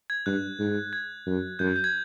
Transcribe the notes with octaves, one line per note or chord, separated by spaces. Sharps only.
G#6
G2 F#6
G#2
G#6
F#2
F#2 G6
G#6
G6
G#6